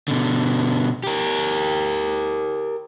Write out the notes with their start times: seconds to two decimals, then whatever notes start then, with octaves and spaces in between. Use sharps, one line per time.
0.08 B2 D3
1.04 G4 A#4